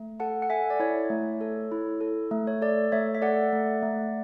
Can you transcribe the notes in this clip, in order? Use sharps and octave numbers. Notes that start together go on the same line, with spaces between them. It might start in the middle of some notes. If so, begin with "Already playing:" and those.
Already playing: A3
A4 F#5 A5
F#5
A4 E5 G#5
D5
E4 C#5
A3
A4
E4
A4
A3
C#5
A4 D5
A3 C#5 E5
E5
A4 D5 F#5
A3
A3